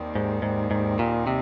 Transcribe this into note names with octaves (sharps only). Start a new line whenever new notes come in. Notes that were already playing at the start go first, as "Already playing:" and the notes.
Already playing: D#2 D#3 G3 C4
G#2
G#2
G#2
A#2
C3